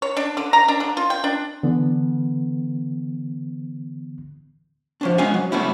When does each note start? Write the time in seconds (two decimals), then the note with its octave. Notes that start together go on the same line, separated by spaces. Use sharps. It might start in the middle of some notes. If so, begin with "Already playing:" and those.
0.02 C#5
0.17 D4
0.37 D3
0.53 A#5
0.68 D4
0.80 D3
0.97 F4
1.10 G5
1.24 D4
1.63 D3 E3 B3
5.01 F3 C#4 D4
5.18 G#3 B3 C#4 D#5 F5 G#5
5.34 F#3
5.52 F#3 G3 A3 B3 C#4 E4